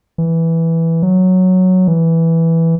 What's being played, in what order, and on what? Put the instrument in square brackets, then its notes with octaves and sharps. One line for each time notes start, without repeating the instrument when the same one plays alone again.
[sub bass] E3
F#3
E3